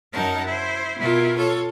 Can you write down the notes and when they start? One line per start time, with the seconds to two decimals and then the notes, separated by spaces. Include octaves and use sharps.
0.13 F#2 D#4 A#4 F#5 A5
0.45 E4 C5
0.98 B2 B3 E4 F4 A#4
1.36 F4 A4 C#5